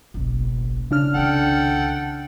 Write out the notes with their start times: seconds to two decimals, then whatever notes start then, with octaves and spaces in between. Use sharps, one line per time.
0.14 F#1 B1
0.91 C#3 D4 F6
1.14 C2 D#3 A4 F#5 G5